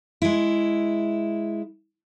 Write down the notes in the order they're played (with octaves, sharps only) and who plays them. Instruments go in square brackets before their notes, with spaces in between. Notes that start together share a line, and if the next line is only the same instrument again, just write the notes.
[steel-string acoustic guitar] G#3 E4